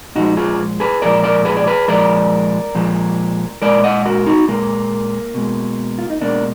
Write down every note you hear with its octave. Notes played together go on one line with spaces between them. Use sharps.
A#2 F3 G#3 D#4 F#4
F4 G#4
G#4 B4
A#2 F3 G#3 A#4 D5
A#4 D5
G#4 B4
D5
G#4 B4
A#2 F3 G#3 A#4 D5
A#2 F3 G#3
A#2 G#3 A#4 D5
D#5 F#5
F#4 A#4
D#4 F#4
A#2 G#3 A#3
B2 G#3
F4
D#4
B2 G#3 A#3 D4